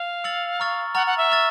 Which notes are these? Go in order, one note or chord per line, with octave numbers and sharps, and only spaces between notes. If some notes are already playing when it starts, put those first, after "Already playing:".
Already playing: F5
E6 A6 C#7 F#7
A#5 C#6 F6 A6
F#5 A#5 C#6 F6 A6
F#5
E5
A#5 C#6 F6 A6